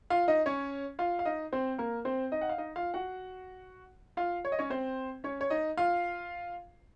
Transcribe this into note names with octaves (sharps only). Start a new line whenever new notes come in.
F4 F5
D#4 D#5
C#4 C#5
F4 F5
F5
D#4 D#5
C4 C5
A#3 A#4
C4 C5
D#4 D#5
F#5
F5
D#4 D#5
F4 F5
F#4 F#5
F4 F5
C#5
D#5
C#4 C#5
C4 C5
C#4 C#5
C#5
D#4 D#5
F4 F5